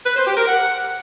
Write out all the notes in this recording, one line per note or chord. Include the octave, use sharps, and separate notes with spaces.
B4
C5
G4
A#4
F#5